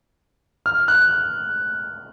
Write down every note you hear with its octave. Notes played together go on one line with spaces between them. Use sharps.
F6
F#6